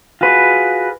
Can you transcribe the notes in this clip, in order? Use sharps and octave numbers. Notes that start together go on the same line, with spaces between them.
F4 F#4 G#4 B4